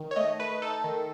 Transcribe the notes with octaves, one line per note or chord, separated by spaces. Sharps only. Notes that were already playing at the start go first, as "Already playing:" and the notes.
Already playing: D#3
C#5
A3 D#5
A3 B4
D#4 A4
D#3